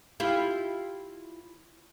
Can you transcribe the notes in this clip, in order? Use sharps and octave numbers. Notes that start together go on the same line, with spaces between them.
E4 F4 G4